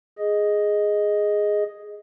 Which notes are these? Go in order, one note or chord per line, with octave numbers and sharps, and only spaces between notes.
G#4 D#5